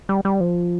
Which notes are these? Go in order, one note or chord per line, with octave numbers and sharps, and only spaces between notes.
G3
G3
F3